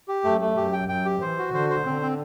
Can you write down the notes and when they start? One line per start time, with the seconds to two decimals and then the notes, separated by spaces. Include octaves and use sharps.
0.08 G4
0.24 F#2 A3
0.41 A3
0.57 F#2 G4
0.73 G5
0.89 F#2 G5
1.05 G4
1.21 E3 C5
1.38 F#4
1.54 D3 C5
1.70 C5
1.85 D3 C4
2.02 C4